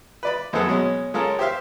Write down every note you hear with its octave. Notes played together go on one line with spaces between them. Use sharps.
B4 D5 B5
A#1 F#2 C4 G#4 A4 F#5
B2 F#3 G#3 C#4
C#3 G#3 C#4 F4 A4 A#4
G4 C5 E5 F5